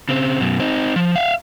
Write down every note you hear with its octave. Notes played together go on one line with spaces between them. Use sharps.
C#3 C4
F#2 B2
C4 D#4
F3
E5 F5